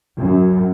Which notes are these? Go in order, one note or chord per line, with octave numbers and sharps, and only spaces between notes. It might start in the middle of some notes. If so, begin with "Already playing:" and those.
F#2